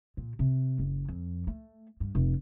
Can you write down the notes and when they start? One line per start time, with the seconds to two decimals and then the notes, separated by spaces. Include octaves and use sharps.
0.17 A#2
0.39 C3
0.79 F#1
1.08 F2
1.47 A3
2.00 G2
2.15 F1